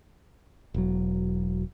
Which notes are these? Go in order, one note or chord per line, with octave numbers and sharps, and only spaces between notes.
E1 F#3